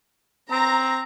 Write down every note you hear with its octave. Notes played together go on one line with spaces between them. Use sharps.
C4 A#5